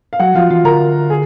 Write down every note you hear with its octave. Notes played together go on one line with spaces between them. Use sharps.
F5
F#3 F#4 F#5
F3 F4 F5
E3 F4 F5
D3 A#4 A#5
G#4 G#5